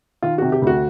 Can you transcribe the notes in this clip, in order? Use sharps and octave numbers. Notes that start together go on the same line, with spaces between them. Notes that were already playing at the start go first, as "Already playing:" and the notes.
D#3 F4
C3 F#4
G4
D2 F#4